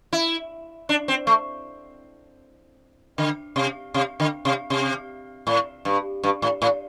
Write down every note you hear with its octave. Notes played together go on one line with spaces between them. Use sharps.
E4
D4
C4
A3
D3
C3
C3
D3
C3
C3
A2
G2
G2
A2
A2